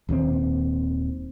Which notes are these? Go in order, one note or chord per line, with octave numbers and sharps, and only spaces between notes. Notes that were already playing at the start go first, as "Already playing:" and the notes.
D#1 D#2 E3 C4